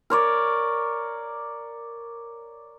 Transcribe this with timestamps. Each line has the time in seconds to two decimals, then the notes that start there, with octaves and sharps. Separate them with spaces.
0.10 A#4 C#5 D5